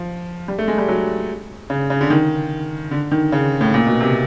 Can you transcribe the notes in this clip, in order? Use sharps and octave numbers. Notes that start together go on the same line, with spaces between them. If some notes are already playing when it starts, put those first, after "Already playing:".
Already playing: F3
G3
A3
G#3
G3
F#3
C#3
C#3
D3
D#3
D3
D#3
C#3
A2
A#2
B2
C3